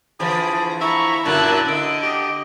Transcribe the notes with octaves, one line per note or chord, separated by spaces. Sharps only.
D3 E3 F3 G#4 B5
E4 A#5 B5 C#6
F#2 A#2 D3 A5 A#5 F#6
D3 D#5 D7
G4